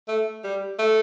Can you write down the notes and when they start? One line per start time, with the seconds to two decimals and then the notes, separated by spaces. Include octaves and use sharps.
0.08 A3
0.44 G3
0.79 A3